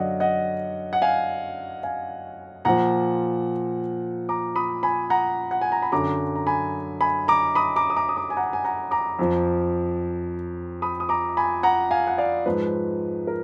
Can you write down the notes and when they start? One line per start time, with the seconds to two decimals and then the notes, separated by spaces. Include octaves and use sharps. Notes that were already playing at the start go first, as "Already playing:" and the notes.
Already playing: F#2 D3 F#3 D5 D#5 F5 F#5
0.20 D#5 F#5
0.93 F#5
1.02 F5 G#5
1.83 F5 G#5
2.65 A#2 F3 F#5 A#5
4.29 A#5 D6
4.56 B5 D#6
4.83 G#5 B5
5.10 F#5 A#5
5.51 F#5
5.61 G#5
5.72 A#5
5.82 B5
5.92 F#2 D3 F#3 A#5 D6
6.35 A#5
6.47 G#5 B5
7.01 G#5 B5
7.28 A#5 D6
7.55 B5 D#6
7.76 A#5 D6
7.90 D#6
7.96 A#5 D6
8.09 D#6
8.17 A#5 D6
8.30 G#5
8.37 F#5 A#5
8.53 G#5
8.64 F#5 A#5
8.91 A#5 D6
9.19 F2 F3
10.82 B5 D#6
11.00 D#6
11.09 A#5 D6
11.37 G#5 B5
11.63 F#5 A#5
11.91 F5 G#5
12.07 F#5
12.18 D5 F5
12.46 G#2 F3 B4
13.27 A#4